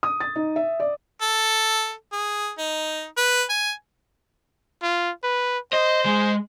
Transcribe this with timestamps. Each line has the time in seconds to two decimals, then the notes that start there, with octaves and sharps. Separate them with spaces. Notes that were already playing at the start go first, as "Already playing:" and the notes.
0.03 D#6
0.20 A6
0.36 D#4
0.56 E5
0.80 D5
1.21 A4
2.13 G#4
2.58 D#4
3.17 B4
3.49 G#5
4.82 F4
5.24 B4
5.73 C5 D#5
6.05 G#3